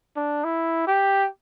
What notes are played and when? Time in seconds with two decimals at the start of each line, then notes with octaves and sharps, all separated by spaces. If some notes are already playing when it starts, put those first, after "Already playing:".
0.17 D4
0.44 E4
0.87 G4